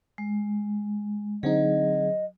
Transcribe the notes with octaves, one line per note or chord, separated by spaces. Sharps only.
G#3
D3 F#3 C4 D#4 G#4 D#5